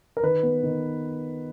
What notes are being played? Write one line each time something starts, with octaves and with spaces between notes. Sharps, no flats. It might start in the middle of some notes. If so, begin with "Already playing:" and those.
A#4
D#3 B4
B3
D#3